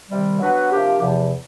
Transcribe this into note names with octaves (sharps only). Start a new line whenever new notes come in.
C3 D#3 G3
F#3 B3 D4 F#4 B4
C3 F3 A#3 D4 G4
E2 C3 F3